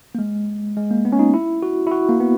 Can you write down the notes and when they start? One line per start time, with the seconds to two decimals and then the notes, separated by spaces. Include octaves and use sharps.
0.15 A#3
0.19 G#3
0.77 G#3
0.91 A#3
1.05 B3
1.12 C#4
1.19 D#4
1.34 E4
1.63 F#4
1.87 E4
1.91 F#4
2.09 A#3
2.20 B3